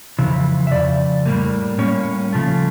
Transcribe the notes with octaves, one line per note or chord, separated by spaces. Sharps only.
F2 C#3 E3
E5
F2 C#3 D5
A2 G3 A#3
A2 G3 A#3 C#4 C#5
C#3 F3 A3